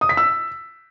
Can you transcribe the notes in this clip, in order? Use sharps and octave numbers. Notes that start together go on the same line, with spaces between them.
D#6
B6
E6